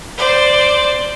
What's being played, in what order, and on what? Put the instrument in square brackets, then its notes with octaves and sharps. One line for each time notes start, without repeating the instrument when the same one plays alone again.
[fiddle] C5 D5